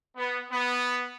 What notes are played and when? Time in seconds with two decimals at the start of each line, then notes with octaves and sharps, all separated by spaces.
0.16 B3
0.51 B3